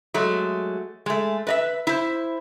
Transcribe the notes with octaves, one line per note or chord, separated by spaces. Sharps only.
F#3 G#3 A3
G#3 A3
B4 D#5 E5
E4 C5